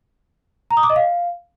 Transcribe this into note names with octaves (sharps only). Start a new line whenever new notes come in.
A#5
D#6
D6
D#5
F5